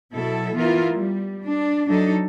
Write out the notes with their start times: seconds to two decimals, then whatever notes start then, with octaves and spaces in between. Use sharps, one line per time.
0.14 B2 F#3 E4 A4
0.55 E3 B3 E4 F4 A#4
0.93 G3
1.45 D4
1.87 F#3 D4 D#4 A4